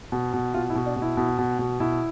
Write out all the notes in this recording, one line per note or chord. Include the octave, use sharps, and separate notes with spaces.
B2
B2
B2 F4
E4
B2
D4
B2
E4
B2
B2
B2
B2 E4